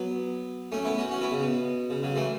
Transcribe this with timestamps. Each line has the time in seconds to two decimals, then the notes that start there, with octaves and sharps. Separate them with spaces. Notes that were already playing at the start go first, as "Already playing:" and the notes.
Already playing: F#3 B3
0.72 A3 C#4
0.85 B3 E4
0.98 C#4 F#4
1.11 C#4 F#4
1.21 B3 E4
1.31 C#3
1.41 B2
1.90 C#3
2.02 C#3 F#3
2.16 E3 A3